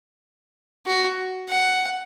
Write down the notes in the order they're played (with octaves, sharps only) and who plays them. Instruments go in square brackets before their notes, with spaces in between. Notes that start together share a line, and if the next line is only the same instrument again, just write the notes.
[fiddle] F#4
F#5